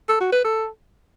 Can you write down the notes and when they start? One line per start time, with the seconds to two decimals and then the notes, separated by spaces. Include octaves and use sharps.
0.09 A4
0.20 F#4
0.32 B4
0.44 A4